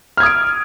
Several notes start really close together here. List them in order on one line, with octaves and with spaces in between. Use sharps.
F6 G#6 D#6 D7